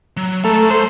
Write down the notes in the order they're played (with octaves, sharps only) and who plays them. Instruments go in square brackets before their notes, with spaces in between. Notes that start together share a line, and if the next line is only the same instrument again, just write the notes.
[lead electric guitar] F#3
[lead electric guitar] G#3 A#5 [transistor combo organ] A3
[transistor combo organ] C5